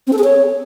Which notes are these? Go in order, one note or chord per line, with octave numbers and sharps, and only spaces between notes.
C4
A4
G#4
C#5